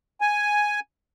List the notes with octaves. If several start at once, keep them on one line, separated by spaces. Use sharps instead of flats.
G#5